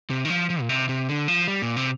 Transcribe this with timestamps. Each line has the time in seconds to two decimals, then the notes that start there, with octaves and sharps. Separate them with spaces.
0.10 C3
0.25 D#3
0.30 F3
0.50 F3
0.61 A#2
0.69 C3
0.89 C3
1.09 D3
1.28 F3
1.48 G3
1.62 A#2
1.77 C3